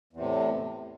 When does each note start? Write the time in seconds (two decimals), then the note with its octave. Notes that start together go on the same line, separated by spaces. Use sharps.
0.13 E2
0.16 C3
0.20 A2